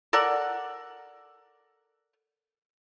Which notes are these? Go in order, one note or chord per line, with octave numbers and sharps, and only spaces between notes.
A4 A#4 D5 F#5